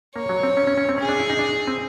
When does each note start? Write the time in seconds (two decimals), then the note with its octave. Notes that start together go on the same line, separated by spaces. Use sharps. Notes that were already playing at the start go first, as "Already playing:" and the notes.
0.16 A#3 C#5
0.29 F#3
0.43 C4
0.57 C#4
0.67 C#4
0.78 C#4
0.89 C4
0.98 C#4 G#4
1.09 D4
1.20 E4
1.30 D#4
1.39 D4
1.67 C4